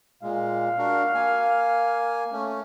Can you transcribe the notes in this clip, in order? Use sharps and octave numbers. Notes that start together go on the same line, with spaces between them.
A#2 G#3 F5
D4 F#4 A#4
A#3 G#5
A3 C#4